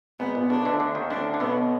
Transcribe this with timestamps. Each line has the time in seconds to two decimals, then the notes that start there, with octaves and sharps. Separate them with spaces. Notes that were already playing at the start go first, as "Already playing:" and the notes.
0.20 G#1 G#2 B3
0.35 A#1 A#2
0.50 B1 B2 D4
0.65 D2 D3
0.80 D2 D3
0.95 D#2 D#3
1.10 D2 D3 D4
1.34 D3
1.40 B1 B2 B3